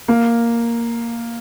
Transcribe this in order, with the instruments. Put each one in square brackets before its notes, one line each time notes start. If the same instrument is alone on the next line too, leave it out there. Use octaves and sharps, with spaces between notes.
[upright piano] A#3